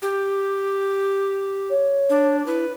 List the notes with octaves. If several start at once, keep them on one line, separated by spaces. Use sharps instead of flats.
G4
C#5
D4
E4 B4